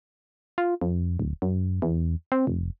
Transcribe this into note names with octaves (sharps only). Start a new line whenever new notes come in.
F4
F2
D1
F#2
E2
C4
F1